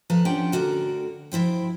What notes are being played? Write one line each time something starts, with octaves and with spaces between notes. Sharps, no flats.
A2 F3 B4 F5 A5 A#5
C#4 D4 F4 G4 F#5 G5
D2 B2 D3 F#4 A#4
F3 E4 C5 G5